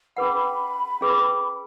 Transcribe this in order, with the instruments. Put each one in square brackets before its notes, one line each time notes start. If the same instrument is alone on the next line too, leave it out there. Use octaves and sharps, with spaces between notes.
[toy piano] C#4 G#4 B4 F#5 [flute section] B5
[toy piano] C#4 G#4 B4